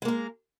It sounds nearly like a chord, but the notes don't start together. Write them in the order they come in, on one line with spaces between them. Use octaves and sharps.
G#3 A#3 A#4